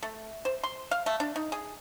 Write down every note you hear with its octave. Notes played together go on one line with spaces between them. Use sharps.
A3
C5
C6
F5
A3
D4
D#4
G#4